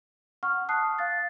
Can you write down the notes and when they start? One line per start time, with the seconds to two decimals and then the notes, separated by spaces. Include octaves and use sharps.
0.43 F#5 C#6 F6
0.69 A5 D#6 F#6 C7
0.98 F5 A6